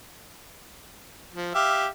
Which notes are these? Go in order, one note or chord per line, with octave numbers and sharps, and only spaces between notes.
F3
G4 E5 F5